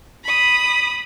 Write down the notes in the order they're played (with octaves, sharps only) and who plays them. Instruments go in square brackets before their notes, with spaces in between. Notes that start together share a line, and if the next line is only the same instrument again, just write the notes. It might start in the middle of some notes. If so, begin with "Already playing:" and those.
[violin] B5 D#6